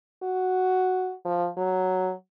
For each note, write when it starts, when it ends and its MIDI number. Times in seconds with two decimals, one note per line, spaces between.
0.23 1.15 66
1.25 1.48 53
1.57 2.12 54